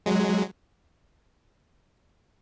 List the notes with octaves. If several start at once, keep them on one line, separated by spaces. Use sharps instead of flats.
F#3 G#3